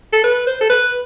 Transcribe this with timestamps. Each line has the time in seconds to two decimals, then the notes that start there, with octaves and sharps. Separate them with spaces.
0.13 A4
0.24 B4
0.47 C5
0.61 A4
0.70 B4